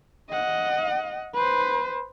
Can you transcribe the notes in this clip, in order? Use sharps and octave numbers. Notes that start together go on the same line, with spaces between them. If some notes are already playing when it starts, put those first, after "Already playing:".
D#5 F#5
B4 C5